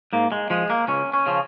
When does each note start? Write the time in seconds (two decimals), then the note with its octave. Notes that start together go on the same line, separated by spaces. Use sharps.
0.13 G#2 A#3
0.32 G#3
0.50 F3 G#3
0.70 A#3
0.88 C#2 C#4
1.14 C#4
1.26 C#3 F3